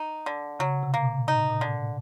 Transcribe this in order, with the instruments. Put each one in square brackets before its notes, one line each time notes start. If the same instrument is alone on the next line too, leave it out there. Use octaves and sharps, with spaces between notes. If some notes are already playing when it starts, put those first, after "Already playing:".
Already playing: [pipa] D#4
D3
[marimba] C#3 [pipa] F#3
[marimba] C3
[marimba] B2 [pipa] A#3
[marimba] A#2
[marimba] A2 [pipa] D#4
[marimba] A#2
[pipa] D3
[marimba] A2